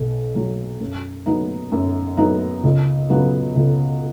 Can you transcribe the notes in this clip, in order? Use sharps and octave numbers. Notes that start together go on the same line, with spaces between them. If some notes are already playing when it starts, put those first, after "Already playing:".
Already playing: B1 B2
B2 F#3
F#2
F#3 B3 D#4
F#2
F#3 B3 D#4
C#2
C#3 F#3 B3
C#2